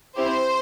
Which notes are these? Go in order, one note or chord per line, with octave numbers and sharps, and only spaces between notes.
C4 E4 G4 C5